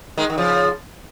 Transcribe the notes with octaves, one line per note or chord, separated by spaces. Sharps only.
D#3 G#3
D#3
C#3 F3